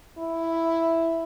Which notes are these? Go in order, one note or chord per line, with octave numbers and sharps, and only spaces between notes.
E4